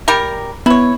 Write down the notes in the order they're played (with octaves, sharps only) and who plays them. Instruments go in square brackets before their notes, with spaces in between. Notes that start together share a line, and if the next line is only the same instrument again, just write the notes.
[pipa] G3 G4 A#4
[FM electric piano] B3 [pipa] E4 C#5